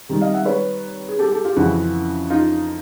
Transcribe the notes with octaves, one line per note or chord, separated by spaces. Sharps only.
C3 D#3 G3
D#5 F5
E5 F#5
B4 C#5
G#4
G4 A4
G4 A4
F4 G4
F2 C#3 E3 E4 F#4
D#4 F4